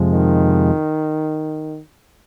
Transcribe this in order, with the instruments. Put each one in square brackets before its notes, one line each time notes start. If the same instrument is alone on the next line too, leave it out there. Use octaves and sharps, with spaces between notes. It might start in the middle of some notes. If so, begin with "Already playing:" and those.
Already playing: [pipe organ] F2 C3 F3 G#3
[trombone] D#3